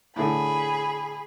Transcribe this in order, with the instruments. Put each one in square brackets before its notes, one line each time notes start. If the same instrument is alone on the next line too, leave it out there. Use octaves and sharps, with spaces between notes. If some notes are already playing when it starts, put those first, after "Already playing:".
[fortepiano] A2 D3 [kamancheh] G#4 B5